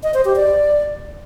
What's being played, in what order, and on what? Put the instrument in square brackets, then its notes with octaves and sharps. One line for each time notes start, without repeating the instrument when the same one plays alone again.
[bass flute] D#5
C5
G4
D5